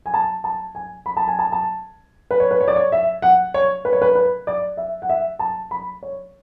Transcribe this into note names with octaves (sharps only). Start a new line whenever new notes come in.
G#5
A5
A5
G#5
B5
A5
G#5
A5
A5
B4
C#5
B4
C#5
D5
C#5
E5
F#5
C#5
B4
C#5
B4
B4
D5
E5
F#5
E5
A5
B5
C#5